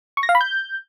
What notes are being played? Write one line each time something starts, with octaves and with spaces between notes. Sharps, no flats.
C#6
A#6
F5
B5
G6